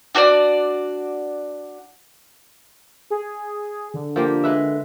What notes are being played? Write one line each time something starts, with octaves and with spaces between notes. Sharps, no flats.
D4 F#4 C#5 D5
G#4
D3
F3 A#3 G4
G#3 B4 E5